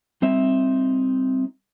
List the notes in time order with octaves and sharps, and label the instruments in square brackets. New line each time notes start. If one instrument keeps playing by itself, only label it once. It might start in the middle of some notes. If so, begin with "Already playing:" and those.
[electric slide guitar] G3 C4 D#4 E5